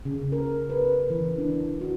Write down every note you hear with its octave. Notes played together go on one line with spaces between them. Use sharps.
C#3
A#4
B4
E3
D4
F#4